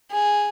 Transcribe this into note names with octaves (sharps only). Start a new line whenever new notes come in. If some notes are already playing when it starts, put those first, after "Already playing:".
G#4